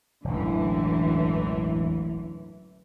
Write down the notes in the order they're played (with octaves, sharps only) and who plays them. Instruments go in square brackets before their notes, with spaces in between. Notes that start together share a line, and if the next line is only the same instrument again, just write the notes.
[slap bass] E1 A1 [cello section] F#2 D3 E3